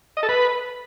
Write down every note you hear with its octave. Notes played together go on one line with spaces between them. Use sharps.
D#5
A4
B4